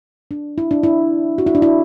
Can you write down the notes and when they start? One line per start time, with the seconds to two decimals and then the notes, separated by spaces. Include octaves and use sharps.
0.31 D4
0.58 E4
0.71 D4
0.83 E4
1.38 F#4
1.47 E4
1.55 D4
1.62 E4